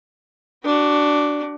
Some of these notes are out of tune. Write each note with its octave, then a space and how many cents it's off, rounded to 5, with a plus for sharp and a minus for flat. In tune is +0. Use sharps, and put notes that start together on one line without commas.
D4 +0 F#4 +25